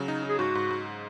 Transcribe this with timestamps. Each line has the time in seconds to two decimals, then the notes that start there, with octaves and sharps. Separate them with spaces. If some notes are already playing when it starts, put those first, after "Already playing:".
Already playing: C#3 F#3
0.08 D#4
0.24 D#4 G#4
0.39 G#2 F#4
0.55 G#2
0.70 G#2